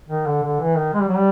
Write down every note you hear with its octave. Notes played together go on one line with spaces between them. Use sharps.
D#3
D3
D3
E3
D#3
G#3
G3
F#3
G3